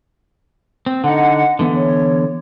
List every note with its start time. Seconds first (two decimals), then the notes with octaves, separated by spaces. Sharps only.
0.86 C4
1.04 D3 D#4 D#5 F#5
1.59 D3 E3 B3
1.75 C#5